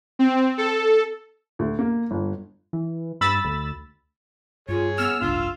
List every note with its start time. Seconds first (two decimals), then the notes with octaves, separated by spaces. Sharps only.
0.19 C4
0.58 A4
1.59 D2
1.79 A#3
2.11 G1
2.73 E3
3.21 G2 B5 E6 A6
3.45 D2
4.69 G2 F4 G#4 C#5
4.98 B3 E6 F6
5.22 F#1 C2 G#2 D4 F4